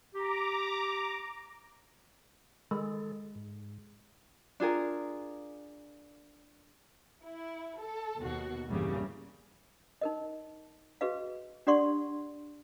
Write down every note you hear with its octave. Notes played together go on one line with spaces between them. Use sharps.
G4 A#5 D6
D#3 G#3 A4
G#2
D4 F4 G#4 A#4
E4
A4
D#2 B2 F#4
B1 E2 G2 A#2 C#3 G3
D#4 A#4 D#5
F#4 G#4 B4 D#5 F5
D4 G4 D5 F#5 C6 C#6